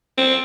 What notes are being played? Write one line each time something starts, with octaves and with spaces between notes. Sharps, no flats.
C4